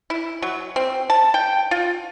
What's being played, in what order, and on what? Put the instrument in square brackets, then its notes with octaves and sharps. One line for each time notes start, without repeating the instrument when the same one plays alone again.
[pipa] E4
F#3
C4
A5
G5
F4